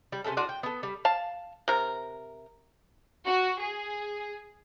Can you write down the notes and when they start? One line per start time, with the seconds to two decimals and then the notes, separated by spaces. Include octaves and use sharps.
0.12 G3
0.24 C3 A3 C#4 A4
0.37 D4 F4 F#4 D5
0.49 G5
0.63 B3 A4
0.83 G3
1.05 F5 A5
1.68 C3 A#4
3.26 F#4
3.60 G#4